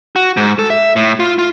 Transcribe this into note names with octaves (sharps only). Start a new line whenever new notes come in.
F#4
G#2
A4
E5
A2
F4
F4